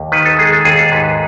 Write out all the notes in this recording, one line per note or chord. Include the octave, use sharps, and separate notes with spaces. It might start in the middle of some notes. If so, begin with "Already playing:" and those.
Already playing: D#2
D#3 B4
A4
G#3 G#4
A4
D#2 G#4
A4
G#2 B4